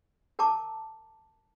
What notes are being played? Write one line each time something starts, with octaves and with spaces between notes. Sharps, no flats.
A#4 A5 A#5 D6